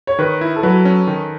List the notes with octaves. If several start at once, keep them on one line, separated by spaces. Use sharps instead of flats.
C#5
D#3 B4
E4
A4
F#3 B4
C#4
D#3